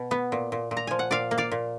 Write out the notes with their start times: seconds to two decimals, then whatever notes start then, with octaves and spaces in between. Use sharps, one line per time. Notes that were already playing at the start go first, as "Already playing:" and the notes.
Already playing: B2
0.11 B3
0.32 A#2
0.52 A#2
0.71 A#2
0.77 A#5
0.87 F3 G#5
0.99 F#5
1.11 A#2 D5 F5
1.31 A#3
1.38 D5 F5
1.51 A#2